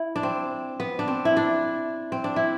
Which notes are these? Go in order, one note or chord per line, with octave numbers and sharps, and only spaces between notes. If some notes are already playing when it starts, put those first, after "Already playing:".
Already playing: E4
D4
C4
B3
D4
C4
E4
D4
C4
D4
E4